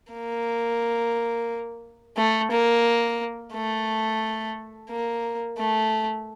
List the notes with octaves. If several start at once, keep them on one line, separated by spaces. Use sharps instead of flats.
A#3
A3
A#3
A3
A#3
A3